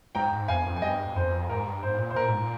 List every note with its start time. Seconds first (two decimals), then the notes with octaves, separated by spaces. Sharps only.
0.15 G#2 G5 A#5
0.32 G#2
0.48 F2 F5 G#5
0.66 F2
0.76 G#5
0.82 G2 D#5 G5
1.08 G2
1.15 F2 C5
1.50 G#2 A#4
1.66 G2
1.83 G#2 C5
1.98 A#2
2.11 C5
2.16 A#2 A#4
2.28 G#2
2.41 A#2